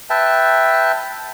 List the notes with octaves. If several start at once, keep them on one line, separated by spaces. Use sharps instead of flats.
B4 E5 G5 A5